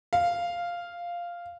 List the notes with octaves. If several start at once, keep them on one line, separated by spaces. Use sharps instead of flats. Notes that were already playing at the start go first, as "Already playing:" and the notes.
F5